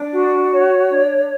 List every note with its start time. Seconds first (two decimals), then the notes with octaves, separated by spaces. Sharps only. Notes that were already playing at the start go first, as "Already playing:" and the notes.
Already playing: D4
0.13 F#4
0.52 C#5
0.90 D4